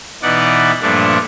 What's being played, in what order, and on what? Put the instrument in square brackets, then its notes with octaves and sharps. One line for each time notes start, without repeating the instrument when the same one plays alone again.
[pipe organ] B2 E3 D#4 D5 F#5
G2 A#2 F3 A3 D4